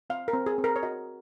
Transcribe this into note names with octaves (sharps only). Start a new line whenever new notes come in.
C4 F5
A#4
C4
G#4
C4
A#4
C#5
F#4 D#5